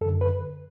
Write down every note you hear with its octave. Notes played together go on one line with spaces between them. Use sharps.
F#2 D3 A4
B4